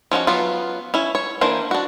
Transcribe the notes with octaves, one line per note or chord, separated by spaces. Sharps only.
F3 C#4 D#4 F#4
F#3 B3 F4
C#4 E4
C#5
E3 A#3 D4 C5
D4 F#4